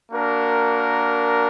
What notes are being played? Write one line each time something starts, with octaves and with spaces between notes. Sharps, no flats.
A#3 D4 F#4 A#4